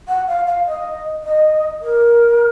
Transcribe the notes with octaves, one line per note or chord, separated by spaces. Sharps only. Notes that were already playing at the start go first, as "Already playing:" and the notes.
F#5
F5
F5
D#5
D#5
A#4